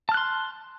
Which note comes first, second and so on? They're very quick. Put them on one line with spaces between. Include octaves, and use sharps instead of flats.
A5 F6 F#6 C6